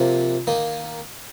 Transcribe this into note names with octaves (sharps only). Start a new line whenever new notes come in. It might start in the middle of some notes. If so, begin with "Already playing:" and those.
Already playing: C3 F3 A#3
D#3 A#3 D#4